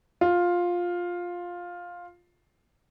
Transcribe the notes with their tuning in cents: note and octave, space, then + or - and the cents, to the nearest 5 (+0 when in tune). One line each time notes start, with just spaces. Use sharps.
F4 +10